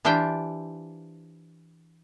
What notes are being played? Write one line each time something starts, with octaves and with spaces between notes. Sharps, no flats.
E3 D4 F4 G4 C5 G5